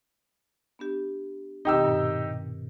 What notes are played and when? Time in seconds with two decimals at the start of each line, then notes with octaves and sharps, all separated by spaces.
0.79 B3 D4 G4
1.65 B2 D#3 C4 D#4 G4 E6
1.84 G2 A#2